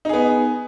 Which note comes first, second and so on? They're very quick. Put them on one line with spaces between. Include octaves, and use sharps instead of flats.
D#4 G#4 B3